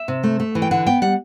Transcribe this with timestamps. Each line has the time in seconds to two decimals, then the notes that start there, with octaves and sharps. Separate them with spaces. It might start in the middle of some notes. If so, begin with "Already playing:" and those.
Already playing: E5
0.08 C3
0.23 A3
0.40 A3
0.55 E3
0.62 G5
0.71 D3 F#5
0.87 B3 G5
1.02 G3 F#5